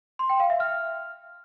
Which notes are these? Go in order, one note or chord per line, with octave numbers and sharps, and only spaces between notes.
C6
G5
F5
E5
F6